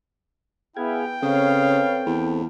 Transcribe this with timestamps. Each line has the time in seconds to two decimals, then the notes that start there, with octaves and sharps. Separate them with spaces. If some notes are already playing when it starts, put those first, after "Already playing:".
0.77 B3 E4 G#4 F5 G5 G#5
1.22 C#3 C4 A4 B4 C#5 F5
2.06 E2